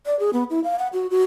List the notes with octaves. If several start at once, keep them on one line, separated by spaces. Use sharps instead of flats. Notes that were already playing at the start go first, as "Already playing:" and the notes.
D5
G#4
B3
E4
F5
F#5
F#4
F#4